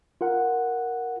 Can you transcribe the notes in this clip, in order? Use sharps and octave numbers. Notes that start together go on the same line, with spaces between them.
F4 A#4 F#5